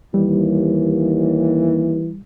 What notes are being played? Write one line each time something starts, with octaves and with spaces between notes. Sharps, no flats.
D#2 E3 G3